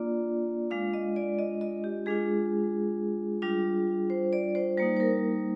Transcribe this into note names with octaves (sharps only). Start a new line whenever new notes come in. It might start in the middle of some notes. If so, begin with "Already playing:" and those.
Already playing: A#3 D4 F4 D5
G#3 D4 F4 F5
D#5
D5
D#5
D#5
G4
G#3 D4 F4 G#4
G3 D4 F4
C5
D5
C5
G3 A#3 D#4 C5
C5
A#4